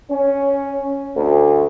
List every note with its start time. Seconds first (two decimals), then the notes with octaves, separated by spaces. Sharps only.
0.11 C#4
1.17 D2